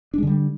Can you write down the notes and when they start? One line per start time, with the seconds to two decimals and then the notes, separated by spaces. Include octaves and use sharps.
0.14 D4
0.18 G#3
0.23 D3
0.27 G3